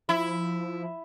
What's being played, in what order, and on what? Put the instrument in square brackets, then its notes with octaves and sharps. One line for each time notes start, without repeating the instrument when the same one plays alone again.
[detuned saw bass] F3 [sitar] E4